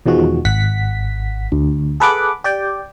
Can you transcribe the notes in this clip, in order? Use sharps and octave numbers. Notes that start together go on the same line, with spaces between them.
E2 B2 D#3 F3 G#3 F#4
G#1 F#5 B6
D2
G#4 A4 B4 F#5 B5 D6
G4 D5 G5